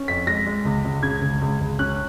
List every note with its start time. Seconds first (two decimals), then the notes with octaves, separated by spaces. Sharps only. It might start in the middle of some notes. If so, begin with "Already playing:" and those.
Already playing: C#4
0.08 F2 B6
0.27 G#3 A#6
0.46 G#3
0.65 C#2
0.84 C#2
1.03 C#3 G#6
1.22 C#2
1.41 C#2
1.60 C#2
1.79 C#4 F#6